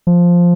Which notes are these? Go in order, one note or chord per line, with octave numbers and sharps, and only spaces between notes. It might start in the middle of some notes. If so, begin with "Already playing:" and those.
F3